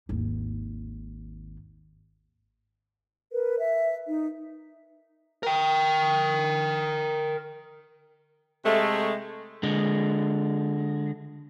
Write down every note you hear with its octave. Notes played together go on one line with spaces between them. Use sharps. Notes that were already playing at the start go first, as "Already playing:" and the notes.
G#1 D#2
A#4 B4
E5
D#4
A#4 G5
C3 G#3 A3
D3 G#3